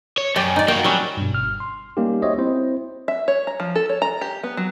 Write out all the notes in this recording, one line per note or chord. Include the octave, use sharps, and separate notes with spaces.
C#5
F#2 G4 D5 G5
D#4 D5
A#3 F#4 G5
F#3 G3 C#4
G2 B2
G1 F6
C6
G3 A#3 B3 C#4 D#4 G4
F#4 G4 C5 C#5 D#5 E5
C4 E4 C5
E5
C#5
A#5
F3
A4
C#5
A#5
G4
B3
F#3